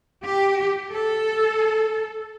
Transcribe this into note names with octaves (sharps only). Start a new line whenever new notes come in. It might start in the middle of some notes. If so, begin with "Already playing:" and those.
G4
A4